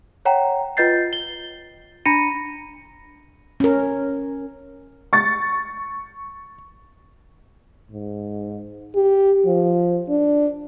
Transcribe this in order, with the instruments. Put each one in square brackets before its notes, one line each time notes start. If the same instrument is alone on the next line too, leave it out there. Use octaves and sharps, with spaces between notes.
[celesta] C#5 F#5 G5 A#5
F4 B4 D#5 G6 A6 C7
G7
D4 A#5 B5 A#6 C#7 D#7
[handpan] C#4 A#4
[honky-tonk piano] C#6 A6
[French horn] G#2
G4
F3
D4